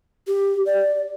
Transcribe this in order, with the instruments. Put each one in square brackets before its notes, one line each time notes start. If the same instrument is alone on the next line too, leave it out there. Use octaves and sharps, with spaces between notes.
[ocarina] G4
D5